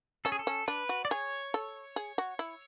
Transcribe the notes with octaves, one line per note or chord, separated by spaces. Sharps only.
C#4 A4
G#4
A4
C#4
D4 B4
F#4
D5
G#4 C#5
A4
G#4
F#4
E4